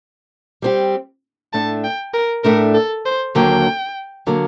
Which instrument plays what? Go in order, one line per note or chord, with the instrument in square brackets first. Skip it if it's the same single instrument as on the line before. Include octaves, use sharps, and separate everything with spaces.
[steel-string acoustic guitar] G3 C4 G4
[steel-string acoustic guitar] A2 A3 D4 [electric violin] A5
[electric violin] G5
A#4
[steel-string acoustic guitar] A2 A3 D4 [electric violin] A#4
[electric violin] A4
C5
[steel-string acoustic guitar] D#2 D3 F#3 A#3 [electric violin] G5
[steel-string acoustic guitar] D3 F#3 A#3